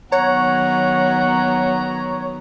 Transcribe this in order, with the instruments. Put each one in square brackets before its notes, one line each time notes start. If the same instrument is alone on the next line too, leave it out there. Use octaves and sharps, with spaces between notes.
[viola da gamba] D#3 F#3 B3 [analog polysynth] C#5 [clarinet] F#5 [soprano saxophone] A#5